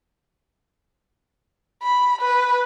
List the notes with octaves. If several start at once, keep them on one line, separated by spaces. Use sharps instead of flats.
B5
B4